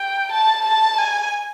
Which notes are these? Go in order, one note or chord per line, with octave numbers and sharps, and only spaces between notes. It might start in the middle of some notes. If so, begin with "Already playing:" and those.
Already playing: G5
A5
A5
G#5